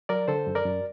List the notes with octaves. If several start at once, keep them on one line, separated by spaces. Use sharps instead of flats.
F#3 A#4 D5
D3 A4 C5
F#2
A#4 D5
F#2